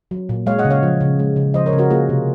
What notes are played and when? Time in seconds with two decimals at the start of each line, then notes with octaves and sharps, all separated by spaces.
0.11 F#3
0.29 A#2
0.46 G#3 C#5 F5
0.59 D#5 F#5
0.65 C#3
0.70 C#5 F5
0.83 F3
1.00 C#3
1.19 G#3
1.36 C#3
1.54 F3 C5 D#5
1.66 A#4 C#5
1.73 C#3
1.78 F#4 A#4
1.90 A#3 F4 G#4
2.09 C3